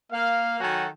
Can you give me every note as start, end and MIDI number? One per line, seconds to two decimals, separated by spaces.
0.12 0.60 58
0.12 0.60 77
0.60 0.88 51
0.60 0.88 54
0.60 0.88 66
0.60 0.88 69
0.60 0.88 80